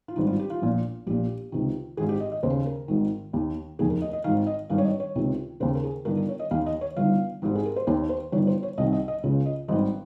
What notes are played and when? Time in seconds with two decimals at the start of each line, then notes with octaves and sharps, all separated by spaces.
0.08 F4
0.16 G#1 G2 D#3 D#4
0.27 F4
0.39 G4
0.50 F4
0.62 A#1 A#2
1.06 A#1 A#2 G4
1.52 C#2 C3 D#3
1.97 G#1 G#2 D#3 G#4
2.09 G4
2.20 D#5
2.32 D#5
2.43 D#2 C#3 C5
2.66 A#4
2.88 G#1 G#2 D#3
3.33 D#2 D#3
3.79 F1 D#2 D#3 G#4
3.90 A#4
4.02 D#5
4.13 D#5
4.24 G#1 G#2 D#3 F5
4.47 D#5
4.70 G#1 G2 D#3 F5
4.78 C#5
4.84 D#5
5.00 C#5
5.15 C#2 C3 D#3
5.60 D#2 C#3 C5
5.75 A#4
5.84 G#4
6.05 G1 G2 D#3 A#4
6.17 A#4
6.29 C#5
6.40 D#5
6.51 D#2 F5
6.54 D#3
6.66 D#5
6.81 C#5
6.97 G1 G2 D#3 F5
7.42 G#1 G#2 D#3 G4
7.55 G#4
7.66 A#4
7.76 C5
7.87 D#2 D#3 C#5
8.09 C5
8.32 G1 G2 D#3 C#5
8.47 C5
8.63 C#5
8.78 C2 C3 D#3 D#5
8.93 D#5
9.08 D#5
9.23 C#2 C#3
9.46 D#5
9.68 G#1 G2 D#3 D#5